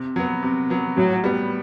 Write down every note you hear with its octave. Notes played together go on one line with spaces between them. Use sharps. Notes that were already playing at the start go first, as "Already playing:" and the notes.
Already playing: C3
F#3 B3
C3
F#3 B3
A2 F#3
G3 B3